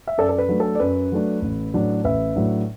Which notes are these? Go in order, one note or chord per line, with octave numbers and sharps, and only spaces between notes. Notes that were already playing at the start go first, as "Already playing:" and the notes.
E5
F#2 A4 D5
A4
B4
F#3 A3 D4
A4
D5
F#2 B4
F#3 A3 D4
A1
A2 F#3 D4
A1 B4 E5
A2 F#3 D4